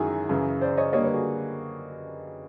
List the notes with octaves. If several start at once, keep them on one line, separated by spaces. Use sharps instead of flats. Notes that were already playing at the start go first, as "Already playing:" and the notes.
Already playing: F#2 D#3 G#3 E4 F#4 G#4
F#2 C#3 E3
C5 D5
C#5 D#5
D3 G3 A#3 C#5 D#5
B4 C#5
F#4 G#4